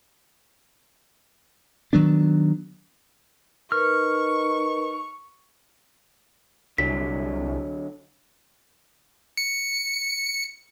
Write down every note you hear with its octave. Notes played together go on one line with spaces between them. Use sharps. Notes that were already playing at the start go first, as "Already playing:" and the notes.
D#3 F#3 B3 D4
D#4 A#4 B4 C#6 F6
C2 D3 F#3 B6
C#7